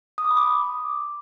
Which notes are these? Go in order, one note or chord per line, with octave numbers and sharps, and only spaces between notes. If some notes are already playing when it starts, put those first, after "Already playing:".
D#6
D6
B5
D6